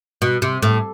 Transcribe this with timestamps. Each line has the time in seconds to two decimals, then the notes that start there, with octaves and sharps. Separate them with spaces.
0.22 B2
0.42 C3
0.62 A2